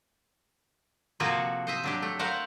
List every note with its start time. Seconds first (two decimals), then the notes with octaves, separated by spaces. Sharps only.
1.20 C3 F3 A#3 F#4 A4 G#5
1.67 C5 D#5 E5
1.84 F#3 D4 G4
2.02 A3
2.19 A3 A#4 C5 F5 F#5